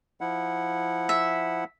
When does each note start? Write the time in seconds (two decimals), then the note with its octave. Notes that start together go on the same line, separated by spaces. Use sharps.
0.21 F3 E4 F#5
1.09 E5